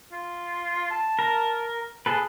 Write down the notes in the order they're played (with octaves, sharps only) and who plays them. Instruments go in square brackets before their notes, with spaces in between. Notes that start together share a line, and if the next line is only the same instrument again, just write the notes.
[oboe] F4
A5
[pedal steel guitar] A#4
[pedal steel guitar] G#4 A4 B4 [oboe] A5